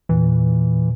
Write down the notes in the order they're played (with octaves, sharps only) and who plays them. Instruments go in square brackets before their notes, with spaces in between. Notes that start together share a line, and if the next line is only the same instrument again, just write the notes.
[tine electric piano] E2 A#2 [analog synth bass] E3